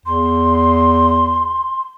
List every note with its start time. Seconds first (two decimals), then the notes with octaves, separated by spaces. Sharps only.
0.06 E2 C6